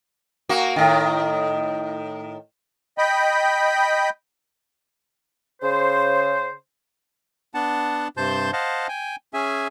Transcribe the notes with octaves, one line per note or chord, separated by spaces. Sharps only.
A#3 F#4
A2 D#3
D#5 G5 B5
C#3 C5
B3 D4 F#5 A5
G2 C3 C5 A5 C6 G6
C5 D#5 F5 F#5 A5
G5 G#5
C#4 G#4 E5 G#5